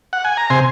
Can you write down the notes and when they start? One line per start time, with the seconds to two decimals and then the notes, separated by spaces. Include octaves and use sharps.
0.13 F#5
0.25 G#5
0.37 A#5
0.50 C3 G#5 C6